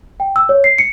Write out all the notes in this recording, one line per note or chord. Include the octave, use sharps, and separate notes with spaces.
G5
E6
C#5
C7
C#7